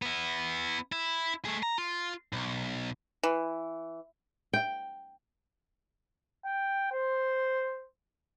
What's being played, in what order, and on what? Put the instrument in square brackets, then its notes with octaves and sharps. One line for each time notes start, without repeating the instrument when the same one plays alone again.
[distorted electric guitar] B3 E4
E4
A3 G#4
A#5
F4
B1
[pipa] E3
[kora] G5
[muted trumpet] G5
C5